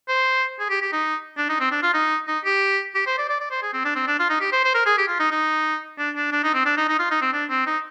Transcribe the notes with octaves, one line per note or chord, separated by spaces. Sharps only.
C5
G#4
G4
G4
D#4
D4
D#4
C4
D4
F4
D#4
D#4
G4
G4
C5
D5
D5
D5
C5
G#4
C4
D4
C4
D4
F4
D#4
G4
C5
C5
A#4
G#4
G4
F4
D#4
D#4
D4
D4
D4
D#4
C4
D4
D#4
D#4
F4
D#4
C4
D4
C4
D#4